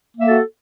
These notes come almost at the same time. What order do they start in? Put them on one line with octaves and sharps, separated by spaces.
A#3 E5 A4 F#4